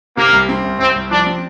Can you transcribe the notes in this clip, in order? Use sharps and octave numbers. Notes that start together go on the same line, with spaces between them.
C3 A#3
C2
C4
C2
C2 C4
C2
F3 D4
C4